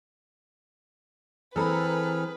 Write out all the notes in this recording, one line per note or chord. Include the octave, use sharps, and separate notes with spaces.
E3 C4 G#4 A4 B4 A#5 B5 F6